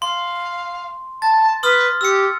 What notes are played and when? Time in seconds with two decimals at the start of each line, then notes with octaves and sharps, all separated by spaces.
0.02 F5 C6
1.22 A5 A6
1.63 B4 C6 D#6 F6
2.01 G4 E6 C#7